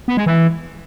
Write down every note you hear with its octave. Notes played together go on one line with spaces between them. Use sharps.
B3
G#3
E3